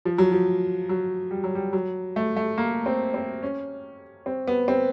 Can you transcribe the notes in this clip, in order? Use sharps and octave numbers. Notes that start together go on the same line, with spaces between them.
F3
F#3
F3
F#3
G3
F#3
G3
F#3
A3
A3
A#3
C4
C4
C#4
C4
B3
C4